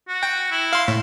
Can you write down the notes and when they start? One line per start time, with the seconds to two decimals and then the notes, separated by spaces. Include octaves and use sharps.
0.08 F#4
0.23 G5
0.51 E4
0.73 F5 C6
0.88 A2